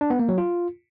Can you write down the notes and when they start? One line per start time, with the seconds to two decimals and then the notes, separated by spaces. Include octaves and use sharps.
0.01 D4
0.10 B3
0.19 A#3
0.29 F#3
0.38 F4